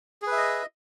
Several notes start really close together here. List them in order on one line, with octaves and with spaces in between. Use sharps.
G#4 B4 E5 D#5